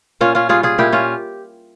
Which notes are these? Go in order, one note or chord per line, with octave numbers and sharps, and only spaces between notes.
A#2 C#4 F4
C#4 F4
G3 F4 G#4
F4 G#4
A#2 E4 G4
C#4 F4